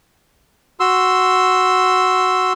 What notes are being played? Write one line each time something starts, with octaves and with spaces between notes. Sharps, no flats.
F#4 C6 E6